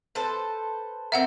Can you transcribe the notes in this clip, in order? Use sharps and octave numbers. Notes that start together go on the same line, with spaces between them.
A4 B4 C5
A#3 C4 E5 F#5